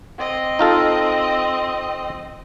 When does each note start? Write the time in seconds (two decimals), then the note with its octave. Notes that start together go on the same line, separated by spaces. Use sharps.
0.18 C4 D#5
0.59 D#4 F4 A4